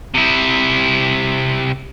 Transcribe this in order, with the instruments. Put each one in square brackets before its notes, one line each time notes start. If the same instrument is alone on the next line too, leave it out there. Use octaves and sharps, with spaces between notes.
[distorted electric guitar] C3 E4